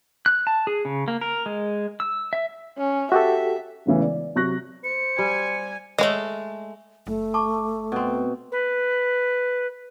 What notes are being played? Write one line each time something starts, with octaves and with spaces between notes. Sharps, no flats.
F#6
A5
G#4
C#3
A#3
A#4
G#3
E6
E5
C#4
F#4 G4 A4 E5
E1 A2 C#3 E3
D5
C3 F#3 C#6 F#6 A#6
C5 C#7
G3 G#5 G#6
G#3 A3 C#5 D#5
F#1 A3
A5 C#6 D6
B2 C4
B4